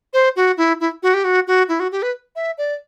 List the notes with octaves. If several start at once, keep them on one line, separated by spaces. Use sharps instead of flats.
C5
F#4
E4
E4
F#4
G4
F#4
F#4
E4
F#4
G4
B4
E5
D5